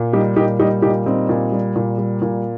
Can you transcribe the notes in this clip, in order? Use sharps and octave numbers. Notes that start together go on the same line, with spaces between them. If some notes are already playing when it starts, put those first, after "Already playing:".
Already playing: A#2
G3 D#4 G4
A#2 D#4 G4
G3 D#4 G4
A#2 D#4 G4
G3 C4 D#4
A#2
G3
A#2
G3
A#2